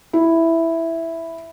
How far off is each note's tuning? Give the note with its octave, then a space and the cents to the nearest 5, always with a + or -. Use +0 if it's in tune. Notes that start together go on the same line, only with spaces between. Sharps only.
E4 +0